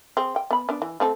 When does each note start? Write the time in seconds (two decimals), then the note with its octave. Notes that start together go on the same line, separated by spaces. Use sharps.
0.17 C4 G#4
0.36 G5
0.51 B3 B5
0.69 B3 D4
0.82 E3
1.00 A3 C4 A4